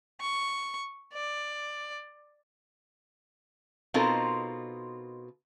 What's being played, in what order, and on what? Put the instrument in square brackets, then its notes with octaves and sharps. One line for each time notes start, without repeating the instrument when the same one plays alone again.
[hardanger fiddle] C#6
D5
[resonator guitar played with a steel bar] B2 C4 D#4 F4 A4 A#4